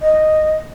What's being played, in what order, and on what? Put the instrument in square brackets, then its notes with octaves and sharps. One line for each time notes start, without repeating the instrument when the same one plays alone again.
[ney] D#5